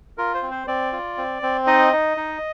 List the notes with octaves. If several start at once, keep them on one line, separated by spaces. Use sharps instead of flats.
F4 A#4
C5
C4
C5
C4 D5
F4
C4
C4
D#4 D#5
D#4
D#4